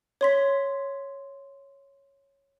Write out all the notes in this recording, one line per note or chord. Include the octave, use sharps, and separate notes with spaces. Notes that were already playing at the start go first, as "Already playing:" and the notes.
C#5 C6 B6